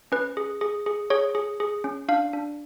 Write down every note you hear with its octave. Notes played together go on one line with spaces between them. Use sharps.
C#4 B4
G#4
G#4
G#4
G#4 C#5
G#4
G#4
C#4
D4 F5
D4